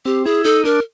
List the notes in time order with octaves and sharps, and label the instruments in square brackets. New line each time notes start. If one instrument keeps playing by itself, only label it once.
[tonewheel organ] C4 [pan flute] G4
[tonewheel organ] E4 [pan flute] G#4
[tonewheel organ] D#4 [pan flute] A4
[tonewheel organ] D4 [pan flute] A#4